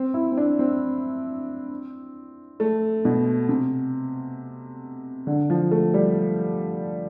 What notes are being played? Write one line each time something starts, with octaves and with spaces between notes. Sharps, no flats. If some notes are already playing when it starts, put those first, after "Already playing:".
Already playing: C4
E4
C4
D4
C4
A3
B2
C3
D3
F3
A3
G3